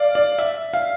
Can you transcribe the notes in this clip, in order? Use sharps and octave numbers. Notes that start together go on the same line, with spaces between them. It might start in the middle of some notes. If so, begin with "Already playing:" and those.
Already playing: D5 F5
D5
E5
F5